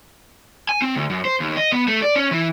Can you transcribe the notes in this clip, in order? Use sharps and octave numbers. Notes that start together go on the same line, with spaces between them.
G#5
C4
D2
F#2
C5
D#2
D#5
B3
A3
D5
C#4
E3